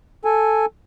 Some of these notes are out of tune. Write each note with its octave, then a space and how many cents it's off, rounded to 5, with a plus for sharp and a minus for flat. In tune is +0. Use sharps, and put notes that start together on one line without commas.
A4 +0 G#5 +0